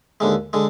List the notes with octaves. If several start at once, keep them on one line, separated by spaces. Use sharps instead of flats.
D#2 D3 G#3
D3 G#3